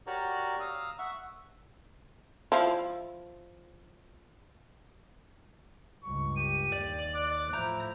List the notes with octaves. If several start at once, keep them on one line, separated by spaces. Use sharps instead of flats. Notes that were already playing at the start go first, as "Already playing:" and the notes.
F#4 G4 A#4 C#5 D5
F5 A#5 D#6 E6
E5 F#5 C#6
F3 E4
C#2 G2 C#6
G4 D#7
D#2 D5
D6 F#6
A2 F3 E4 A#5 G6